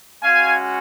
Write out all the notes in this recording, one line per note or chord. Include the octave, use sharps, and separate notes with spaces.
G#3 C#4 F#4 F5 G#5